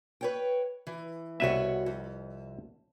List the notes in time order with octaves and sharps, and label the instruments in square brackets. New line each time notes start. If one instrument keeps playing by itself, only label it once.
[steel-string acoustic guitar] B4 C#5 G5
E3
[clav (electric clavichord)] C2 B4 E5 [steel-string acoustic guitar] B2 F#4 C#5
[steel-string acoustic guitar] F2